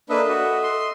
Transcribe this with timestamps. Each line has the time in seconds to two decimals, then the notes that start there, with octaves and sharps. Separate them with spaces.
0.10 A#3 D4 A4 B4 D#5 E5
0.29 F#4
0.63 C6